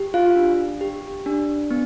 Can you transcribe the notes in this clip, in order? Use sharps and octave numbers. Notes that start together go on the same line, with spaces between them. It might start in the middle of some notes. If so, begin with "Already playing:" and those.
Already playing: G4
F4 F5
D4
G4
D4
B3